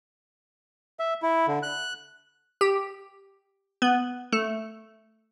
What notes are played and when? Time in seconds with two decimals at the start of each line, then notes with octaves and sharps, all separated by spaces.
1.00 E5
1.22 E4
1.48 D3
1.63 F#6
2.61 G4
3.82 B3
4.32 A3